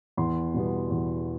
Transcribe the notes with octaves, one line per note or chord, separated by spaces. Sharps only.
E2 C6
B2 G3 B3
E2